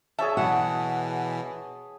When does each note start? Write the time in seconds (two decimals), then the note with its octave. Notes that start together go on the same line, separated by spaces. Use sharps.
0.19 G#4 C#5 E5 A5
0.37 B2 E3 F#5